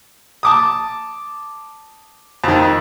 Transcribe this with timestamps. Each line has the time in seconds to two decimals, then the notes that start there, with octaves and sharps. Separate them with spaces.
0.43 A5 D6 D#6
2.44 F2 D#3